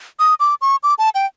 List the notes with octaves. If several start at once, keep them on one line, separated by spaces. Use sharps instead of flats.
D#6
D6
C#6
D6
A5
G5